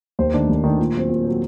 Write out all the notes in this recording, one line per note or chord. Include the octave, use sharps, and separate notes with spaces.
D#2 C5
D#3 A3 D4
D#2
D#3 A3 D4
A#2
F#3 C4
A#2
F#3 C4